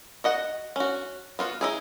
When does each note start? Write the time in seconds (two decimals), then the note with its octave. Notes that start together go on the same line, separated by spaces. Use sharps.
0.24 F#4 D#5 F#5
0.76 C#4 F#4
1.39 B3 F4 F#4
1.61 D#4 E4 G#4